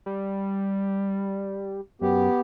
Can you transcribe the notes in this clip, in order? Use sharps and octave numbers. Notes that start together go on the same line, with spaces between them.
G3
F#2 B3 G4